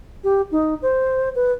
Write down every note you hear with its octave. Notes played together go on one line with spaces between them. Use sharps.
G4
D#4
C5
B4